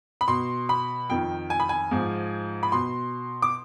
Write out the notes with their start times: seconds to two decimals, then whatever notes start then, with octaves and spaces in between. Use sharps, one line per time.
0.21 B5
0.28 B2 C6
0.69 B5
1.10 F2 D#3 G5
1.50 G#5
1.60 B5
1.69 G#5
1.91 G#2 F3
2.63 B5
2.72 B2 C6
3.42 D6